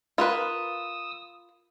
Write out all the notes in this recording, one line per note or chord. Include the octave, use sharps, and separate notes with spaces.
F4 A#4 B4 D#6 E6